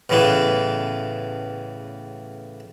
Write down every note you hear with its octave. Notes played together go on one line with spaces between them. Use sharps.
A1 E2 A2 C#3 E3